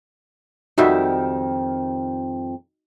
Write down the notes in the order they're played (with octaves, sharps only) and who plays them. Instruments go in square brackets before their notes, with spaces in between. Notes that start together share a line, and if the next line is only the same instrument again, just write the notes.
[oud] F2 D#3 G3 [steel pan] D#4 F#4 E5